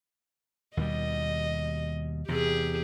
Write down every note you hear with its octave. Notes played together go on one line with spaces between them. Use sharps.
D#2 B2 G3 D#5
E2 C3 G4 G#4